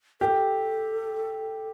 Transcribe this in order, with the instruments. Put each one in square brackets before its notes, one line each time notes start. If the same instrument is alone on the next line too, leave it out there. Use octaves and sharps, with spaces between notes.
[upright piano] G4 [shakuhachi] A4 A#4